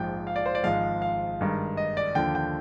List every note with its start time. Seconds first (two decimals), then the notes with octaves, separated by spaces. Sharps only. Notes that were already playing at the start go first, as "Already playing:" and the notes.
Already playing: A#1 G#2 F3 G5
0.27 F5
0.36 D5
0.46 C5
0.55 D5
0.64 G#1 G#2 F3 G#3 F5
1.02 F5
1.41 G2 D#3 G#3
1.77 D#5
1.97 D5
2.15 D#2 D3 F3 G5
2.35 G5